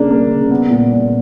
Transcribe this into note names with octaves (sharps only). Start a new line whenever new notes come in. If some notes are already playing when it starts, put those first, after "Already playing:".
Already playing: C#3 A#3 D4
A#3
C#3
B3
A#2
A#2